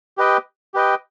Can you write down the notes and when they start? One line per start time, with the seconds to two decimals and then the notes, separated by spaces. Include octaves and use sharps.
0.18 G4 B4 D#5 G5
0.74 G4 B4 D#5 G5